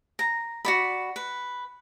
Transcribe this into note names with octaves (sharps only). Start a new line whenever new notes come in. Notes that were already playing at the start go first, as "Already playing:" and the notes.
A#5
F#4 D5 B5
B4